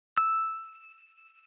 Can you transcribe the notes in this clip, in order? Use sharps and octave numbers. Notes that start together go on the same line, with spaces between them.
E6